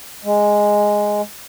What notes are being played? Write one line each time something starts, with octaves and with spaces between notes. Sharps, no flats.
G#3